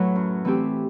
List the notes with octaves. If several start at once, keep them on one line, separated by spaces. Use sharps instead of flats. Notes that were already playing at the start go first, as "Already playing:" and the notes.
Already playing: A2 F#3 A3 E4 B4
F#2
E3 A3 C4 G4